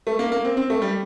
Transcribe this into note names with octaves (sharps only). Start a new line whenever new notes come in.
A3
A#3
A#3
C4
C4
A3
G3